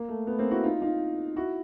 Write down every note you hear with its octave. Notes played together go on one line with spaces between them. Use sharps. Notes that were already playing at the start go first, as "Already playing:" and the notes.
Already playing: A#3
A3
A3 B3
A#3 C4
E4 F#4
D#4 F4
D#4 F4
E4 F#4